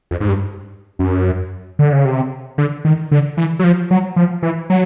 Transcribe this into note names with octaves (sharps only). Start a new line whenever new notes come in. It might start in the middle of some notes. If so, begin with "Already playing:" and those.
F2
G#2
G2
F#2
D3
C#3
C3
D3
D#3
D3
E3
F#3
F3
F#3
F3
E3
F#3